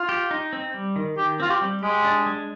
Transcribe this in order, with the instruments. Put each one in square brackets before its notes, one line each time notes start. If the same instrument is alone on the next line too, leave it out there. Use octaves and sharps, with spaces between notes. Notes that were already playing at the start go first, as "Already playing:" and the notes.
Already playing: [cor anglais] F4
[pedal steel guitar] G4
D#4
C4
G3
D#3
[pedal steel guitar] D#3 [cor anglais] G4
[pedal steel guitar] C4 [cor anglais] F4
[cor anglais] G4
[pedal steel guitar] G3
[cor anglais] G#3 [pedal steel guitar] G4
[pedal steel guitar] D4
G#3